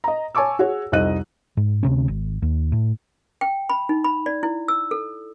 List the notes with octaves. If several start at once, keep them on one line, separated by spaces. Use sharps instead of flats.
D#5 A#5
C#5 G#5 A5 C#6 D6 E6
F#4 G#4 C#5
C2 F2 D#4 D#5 F#6 D#7
G#2
D2 C3 C#4
G#1
D#2
A2
G5
B5
D#4
B5
D5
E4
E6
A4